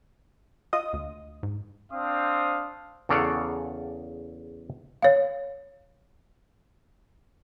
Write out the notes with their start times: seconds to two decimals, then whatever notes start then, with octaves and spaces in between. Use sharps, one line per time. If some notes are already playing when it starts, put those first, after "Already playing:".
0.73 F4 D#5 D#6
0.93 D2
1.43 G#2
1.92 C4 D4 C5 F5 D#6
3.09 E2 C#3 A4 D5 F5 F#5
5.02 C#5 F5